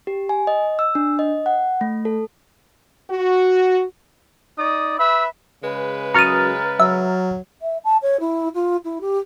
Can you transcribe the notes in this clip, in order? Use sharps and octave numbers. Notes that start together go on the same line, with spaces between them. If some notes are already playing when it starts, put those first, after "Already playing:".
G4
G#5
D#5
E6
D4
D#5
F#5
A3
A4
F#4
D#4 D5 D#6
B4 E5 B5 E6
C#3 G#3 B4
F#2 A#5 C#6 D#6 F6 A6
F#3 E5
E5
A5
C#5
E4
F4
E4
G4